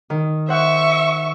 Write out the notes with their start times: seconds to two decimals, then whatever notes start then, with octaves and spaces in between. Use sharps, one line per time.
0.10 D#3
0.48 C5 E5 F#5 C#6